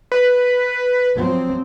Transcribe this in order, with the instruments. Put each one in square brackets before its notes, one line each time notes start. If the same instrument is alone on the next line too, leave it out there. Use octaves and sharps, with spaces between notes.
[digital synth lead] B4
[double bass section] F3 F#3 C4